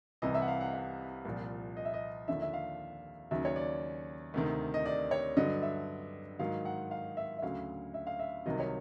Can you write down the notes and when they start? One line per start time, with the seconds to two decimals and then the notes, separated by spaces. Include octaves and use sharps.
0.22 C2 C3 E3 D#5
0.35 E5
0.42 F#5
0.48 F5
0.60 F#5
0.74 F5
1.25 C2 A#2 F3
1.77 D#5
1.85 E5
1.94 D#5
2.28 D#2 D3 F3 E5
2.42 E5
2.53 F5
3.31 D#2 C#3 F#3 E5
3.45 C#5
3.56 D5
4.34 D2 C3 D#3
4.74 D#5
4.86 D5
5.11 C#5
5.37 G2 D3 F#3 D#5
5.62 E5
6.39 G#2 D#3 F#3 F5
6.65 F#5
6.91 F5
7.17 E5
7.38 E5
7.43 D2 C#3 F#3 F5
7.94 E5
8.07 F5
8.19 E5
8.46 C2 C3 D#3 F#3 D#5
8.60 C#5